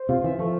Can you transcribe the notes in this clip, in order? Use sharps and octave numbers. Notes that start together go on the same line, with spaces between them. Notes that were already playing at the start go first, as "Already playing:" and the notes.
Already playing: C5
C3 F4
E3 E5
F3 A3